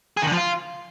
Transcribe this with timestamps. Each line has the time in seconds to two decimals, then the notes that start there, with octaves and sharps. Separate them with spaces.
0.17 G#4
0.22 D#3
0.27 D3
0.32 F3
0.37 F4